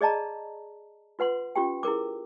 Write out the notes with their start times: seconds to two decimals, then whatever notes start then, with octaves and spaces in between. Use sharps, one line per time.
0.01 G#4 D5 D#5 A5 A#5
1.19 F4 B4 F#5 C6
1.55 C#4 F4 G4 G5
1.83 E4 G#4 A#4 D6